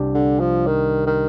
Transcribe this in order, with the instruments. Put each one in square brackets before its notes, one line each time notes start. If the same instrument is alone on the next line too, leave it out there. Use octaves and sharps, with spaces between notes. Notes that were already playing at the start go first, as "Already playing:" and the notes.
Already playing: [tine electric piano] C2 C3 G3 D4 G4
[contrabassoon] D3
F3
D#3
D#3